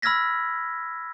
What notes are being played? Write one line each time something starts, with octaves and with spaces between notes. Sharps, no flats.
B5 E6 F6 G#6 A#6 B6